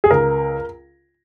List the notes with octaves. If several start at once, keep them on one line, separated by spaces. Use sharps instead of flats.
G#4
C#2 A#4